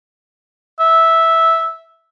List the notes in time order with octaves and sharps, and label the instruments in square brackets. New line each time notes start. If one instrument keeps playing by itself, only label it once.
[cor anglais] E5